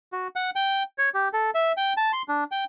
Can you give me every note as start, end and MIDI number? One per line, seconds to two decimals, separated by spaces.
0.13 0.28 66
0.36 0.50 78
0.56 0.83 79
0.98 1.09 73
1.14 1.28 67
1.33 1.51 69
1.54 1.72 76
1.77 1.93 79
1.97 2.12 81
2.13 2.22 84
2.28 2.44 62
2.51 2.64 79